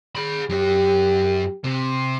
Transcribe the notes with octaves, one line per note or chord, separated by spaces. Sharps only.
G#4 B5
F#2 G4 C#5
C3